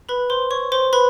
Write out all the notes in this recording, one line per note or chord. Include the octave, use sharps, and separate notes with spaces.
B4 B5
C5 C6
C#5 C#6
C5 C6
B4 B5